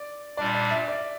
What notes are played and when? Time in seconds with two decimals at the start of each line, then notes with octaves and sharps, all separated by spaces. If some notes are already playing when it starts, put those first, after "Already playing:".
Already playing: D5
0.37 A#2 G3 D4 D5
0.55 D5
0.71 E5
0.88 D5